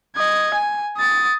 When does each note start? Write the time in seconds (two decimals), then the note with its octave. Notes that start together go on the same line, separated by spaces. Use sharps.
0.16 D#5 G#6
0.54 G#5
0.97 D#6 A6